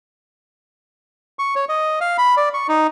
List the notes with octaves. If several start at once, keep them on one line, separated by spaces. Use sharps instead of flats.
C#6
C#5
D#5
F5
B5
D5
C#6
D#4